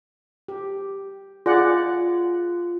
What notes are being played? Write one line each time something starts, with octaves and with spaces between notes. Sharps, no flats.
G4
F4 G#4 D5 F#5